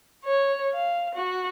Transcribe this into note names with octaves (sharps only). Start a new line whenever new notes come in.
C#5
F5
F#4